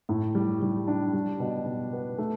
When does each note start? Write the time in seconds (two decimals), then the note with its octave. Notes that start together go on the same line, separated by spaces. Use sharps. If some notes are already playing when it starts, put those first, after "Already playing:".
0.09 A2
0.35 G3
0.62 G3
0.88 D4
1.13 G3
1.40 B2
1.66 B2
1.93 B3
2.18 A3